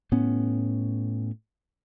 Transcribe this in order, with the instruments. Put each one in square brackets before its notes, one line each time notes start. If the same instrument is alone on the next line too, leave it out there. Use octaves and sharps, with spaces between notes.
[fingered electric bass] A2 B3 C#4